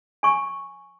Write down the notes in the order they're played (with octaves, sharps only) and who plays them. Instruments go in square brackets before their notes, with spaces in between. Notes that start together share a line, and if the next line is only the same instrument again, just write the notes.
[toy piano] G#5 C#6